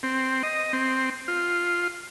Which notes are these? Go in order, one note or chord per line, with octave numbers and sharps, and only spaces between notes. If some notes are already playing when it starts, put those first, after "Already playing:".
C4
D#5
C4
F4